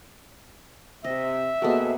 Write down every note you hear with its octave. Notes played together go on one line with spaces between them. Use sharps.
C3 D#5 E5
C3 A#3 B3 F#4 G#4 A4 D#5